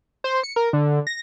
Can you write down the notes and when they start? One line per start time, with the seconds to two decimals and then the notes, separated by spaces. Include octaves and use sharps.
0.24 C5
0.43 C#7
0.56 A#4
0.73 D3
1.07 A#6